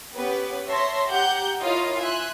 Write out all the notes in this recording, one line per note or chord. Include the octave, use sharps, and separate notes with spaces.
B3 C#4 G4 B4
C#5 E5 A5 C6 A#6
G4 F#5 A#5 G6
E4 F4 A#4 C#5 D#5 F5
E5 G#5 C6 F#6